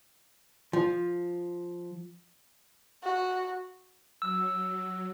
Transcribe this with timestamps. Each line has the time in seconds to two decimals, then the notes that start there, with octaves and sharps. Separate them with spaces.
0.73 F3
3.04 F#4
4.22 F#3 E6